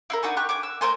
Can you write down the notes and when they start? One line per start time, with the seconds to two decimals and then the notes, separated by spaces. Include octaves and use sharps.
0.10 E4 F4 A#4
0.23 D4 D#4 F#4 G#5
0.37 G4 C#6 F#6
0.49 G#5 D6
0.63 E6
0.81 A3 A#4 C5 G#5